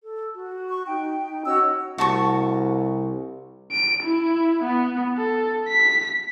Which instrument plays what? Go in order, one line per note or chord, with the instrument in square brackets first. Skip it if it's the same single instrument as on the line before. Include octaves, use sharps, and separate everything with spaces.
[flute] A4
F#4
[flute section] C#6
[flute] D#4 [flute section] G5
[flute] D#4
[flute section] C#4 F#4 E6 [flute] D#5
[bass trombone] C2 [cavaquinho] F#4 A5 C#6
[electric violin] D7
E4
B3
A4
B6